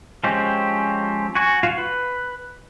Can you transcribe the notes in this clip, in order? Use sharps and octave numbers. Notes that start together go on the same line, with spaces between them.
F3 G#3 C4 C#4 G4
F#4 G#5 C#6
F4 F#4 F5
B4